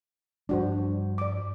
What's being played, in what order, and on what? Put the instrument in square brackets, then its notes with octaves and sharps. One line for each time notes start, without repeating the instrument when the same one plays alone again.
[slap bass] G2 F3 G3 [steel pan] D4 F#4 C5
[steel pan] D5 D6